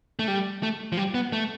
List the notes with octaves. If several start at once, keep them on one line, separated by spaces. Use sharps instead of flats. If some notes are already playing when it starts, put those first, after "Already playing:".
A3
G3
A3
F3
G3
B3
A3